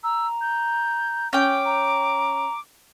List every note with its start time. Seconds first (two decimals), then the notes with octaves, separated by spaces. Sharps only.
0.04 A#5 E6
0.41 G6
1.33 C#4 G5 D6
1.65 A#5